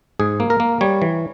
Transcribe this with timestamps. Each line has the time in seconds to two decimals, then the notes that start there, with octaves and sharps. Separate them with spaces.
0.20 G#2 G#4
0.40 A#3
0.50 A#4
0.60 A#3
0.81 G3 C#5
1.02 E3